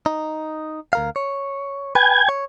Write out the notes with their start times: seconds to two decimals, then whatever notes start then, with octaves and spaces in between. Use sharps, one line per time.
0.06 D#4
0.93 D2 A#4 F5
1.16 C#5
1.95 B4 G5 G#5 G#6
2.29 C#5